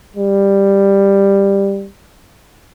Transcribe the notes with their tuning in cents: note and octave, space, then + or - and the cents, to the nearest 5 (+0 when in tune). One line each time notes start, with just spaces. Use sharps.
G3 +10